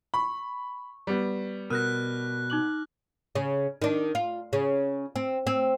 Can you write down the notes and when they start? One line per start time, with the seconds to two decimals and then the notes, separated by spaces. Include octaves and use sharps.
0.14 B5 C#6
1.07 G3 B3
1.70 B2 A#4 F6 F#6 A#6
2.50 D#4 D6 F#7
3.35 C#3
3.82 D#3 D4
4.15 F4
4.53 C#3
5.16 C4
5.47 C4